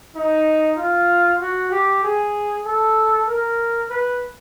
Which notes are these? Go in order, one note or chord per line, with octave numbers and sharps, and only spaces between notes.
D#4
F4
F#4
G4
G#4
A4
A#4
B4